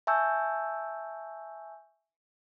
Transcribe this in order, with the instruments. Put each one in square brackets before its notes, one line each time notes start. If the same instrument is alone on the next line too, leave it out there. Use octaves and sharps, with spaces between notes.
[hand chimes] E5 G#5 A5 C#6 E6 G6